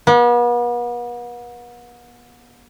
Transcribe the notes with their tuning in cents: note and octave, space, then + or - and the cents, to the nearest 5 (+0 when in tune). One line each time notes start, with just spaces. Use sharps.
B3 -40